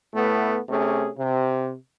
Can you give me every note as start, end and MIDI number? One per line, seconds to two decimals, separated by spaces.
0.14 0.58 45
0.14 0.58 57
0.14 0.58 59
0.69 1.09 48
0.69 1.09 57
0.69 1.09 61
0.69 1.09 68
1.17 1.72 48